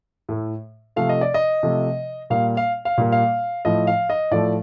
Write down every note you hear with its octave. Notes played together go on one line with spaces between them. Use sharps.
A2 A3
C3 F3 A3 F5
D#5
D5
D#5
C3 F3 A3
A#2 G3 A#3 F5
F5
F5
A#2 G3 A#3
F5
A2 F3 A3 D#5
F5
D#5
A2 F3 A3 D5